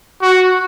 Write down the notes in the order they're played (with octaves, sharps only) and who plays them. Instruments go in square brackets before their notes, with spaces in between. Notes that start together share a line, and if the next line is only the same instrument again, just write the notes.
[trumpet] F#4